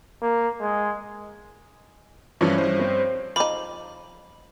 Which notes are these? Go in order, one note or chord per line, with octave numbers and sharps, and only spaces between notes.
A#3
G#3
G2 E3 F3 C#4 D4 E4
G2 C5
C4 C#5
F3 D#4 B5 D6